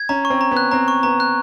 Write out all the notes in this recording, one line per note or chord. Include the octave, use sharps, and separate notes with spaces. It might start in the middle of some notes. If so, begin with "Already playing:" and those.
Already playing: G#6
C#4 A#5
C#6
C4
A#5
B3
F#6
C4 A#5
C#6
B3 A#5
F#6